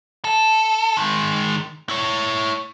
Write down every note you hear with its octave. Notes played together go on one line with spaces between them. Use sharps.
A4
D#3 G#3
E4 C#5